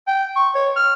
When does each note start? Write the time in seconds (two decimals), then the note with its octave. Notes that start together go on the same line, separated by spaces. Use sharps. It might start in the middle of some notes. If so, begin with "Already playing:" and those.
0.08 G5
0.36 C#6
0.55 C#5
0.76 F6